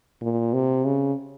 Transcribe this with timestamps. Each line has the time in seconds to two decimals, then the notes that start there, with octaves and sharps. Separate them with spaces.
0.22 A#2
0.53 C3
0.85 C#3